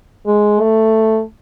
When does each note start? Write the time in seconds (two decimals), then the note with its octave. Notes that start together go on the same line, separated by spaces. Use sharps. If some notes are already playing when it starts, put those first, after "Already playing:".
0.26 G#3
0.60 A3